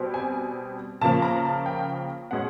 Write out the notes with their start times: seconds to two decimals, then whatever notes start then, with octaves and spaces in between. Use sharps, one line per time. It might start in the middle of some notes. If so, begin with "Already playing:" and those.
Already playing: B2 G3 C4
0.14 G#5
1.01 C#3 F3 A#3 A5
1.22 A#5
1.45 A5
1.66 G5
2.31 B2 G#3 C#4 F#5